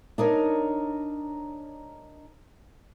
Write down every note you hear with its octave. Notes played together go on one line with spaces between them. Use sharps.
D4 D#4 A#4 C#5